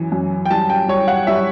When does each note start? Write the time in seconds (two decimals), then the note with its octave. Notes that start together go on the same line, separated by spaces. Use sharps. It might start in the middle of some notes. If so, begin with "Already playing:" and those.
Already playing: F#2 E3
0.12 F#2
0.46 G5
0.51 G3 A5
0.70 G5
0.88 G3 C#5
1.08 F#5
1.27 G3 E5